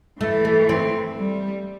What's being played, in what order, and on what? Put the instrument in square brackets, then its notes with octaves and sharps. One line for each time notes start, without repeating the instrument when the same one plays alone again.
[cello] E3 [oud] A3
[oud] A3
C4
[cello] G3